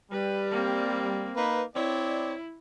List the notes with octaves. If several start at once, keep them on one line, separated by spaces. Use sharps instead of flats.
G3 B4
A#3 C4
A#3 D#4 B4
C4 E4 C#5 D5